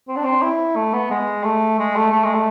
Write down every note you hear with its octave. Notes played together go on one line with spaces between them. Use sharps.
C4
D4
C4
E4
A3
B3
G#3
A3
G#3
A3
A3
G#3
A3